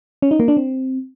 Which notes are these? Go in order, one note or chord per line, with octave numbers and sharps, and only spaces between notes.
C#4
D#4
A#3
D4
C4